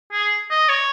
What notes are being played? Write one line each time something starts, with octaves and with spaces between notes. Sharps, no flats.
G#4
D#5
C#5